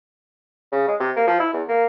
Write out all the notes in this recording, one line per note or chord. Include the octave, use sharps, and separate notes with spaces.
C#3
G#3
C3
A#3
F3
E4
E2
A#3